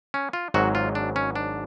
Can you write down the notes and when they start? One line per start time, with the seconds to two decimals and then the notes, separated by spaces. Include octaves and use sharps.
0.14 C#4
0.33 F4
0.54 G#1 G#2 F#3 F#4
0.75 F4
0.95 D4
1.16 C#4
1.36 D4